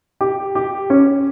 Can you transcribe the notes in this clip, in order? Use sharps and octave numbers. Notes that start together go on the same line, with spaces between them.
G4
G4
C#4